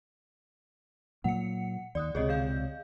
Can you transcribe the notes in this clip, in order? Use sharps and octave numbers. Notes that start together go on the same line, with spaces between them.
A#2 F#3 A#3 F#5 C#7
D#2 D5 D#6 F#6
C#2 C3 G#4 C#5 D#5
D3 F5 G6